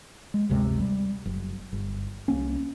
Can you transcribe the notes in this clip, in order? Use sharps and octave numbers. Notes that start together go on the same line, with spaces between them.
G#3
G1 D2 C3 G#3
G3
F#1
G1
C2 A#3 C#4